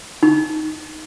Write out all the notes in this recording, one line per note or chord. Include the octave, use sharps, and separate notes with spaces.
D#4